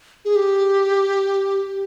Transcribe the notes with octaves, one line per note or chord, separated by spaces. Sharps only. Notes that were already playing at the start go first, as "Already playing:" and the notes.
G#4
G4